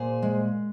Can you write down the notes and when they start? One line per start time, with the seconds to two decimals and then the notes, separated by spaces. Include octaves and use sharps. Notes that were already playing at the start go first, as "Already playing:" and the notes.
Already playing: A#2 G#4 C5
0.22 G#3